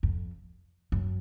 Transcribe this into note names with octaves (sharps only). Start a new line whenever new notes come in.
F2
F#2